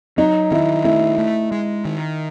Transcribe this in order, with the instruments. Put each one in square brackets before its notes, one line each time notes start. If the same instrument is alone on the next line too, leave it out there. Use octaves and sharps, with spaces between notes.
[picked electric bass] F#3 [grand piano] D#4
[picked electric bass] D#3 [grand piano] E4
[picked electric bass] A3 [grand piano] E4
[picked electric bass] A3
G#3
D#3